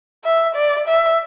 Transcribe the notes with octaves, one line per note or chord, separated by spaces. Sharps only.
E5
D5
E5